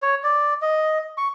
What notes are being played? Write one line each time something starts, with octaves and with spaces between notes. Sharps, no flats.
C#5
D5
D#5
C#6